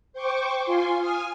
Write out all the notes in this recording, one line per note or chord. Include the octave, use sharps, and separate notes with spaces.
C5 G5 C#6 D6
F4 G#5 C6
G#5 D#6 F6